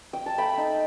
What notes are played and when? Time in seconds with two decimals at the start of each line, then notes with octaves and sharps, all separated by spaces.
0.13 G5
0.26 A5
0.38 A3 G5 B5
0.57 D#4